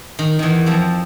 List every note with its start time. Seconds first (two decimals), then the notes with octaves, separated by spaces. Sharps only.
0.19 D#3
0.39 E2 D#3 E3
0.66 F2 F3